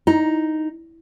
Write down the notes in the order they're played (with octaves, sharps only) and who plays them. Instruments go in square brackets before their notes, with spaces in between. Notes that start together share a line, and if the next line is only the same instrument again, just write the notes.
[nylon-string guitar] D#4 [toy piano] E4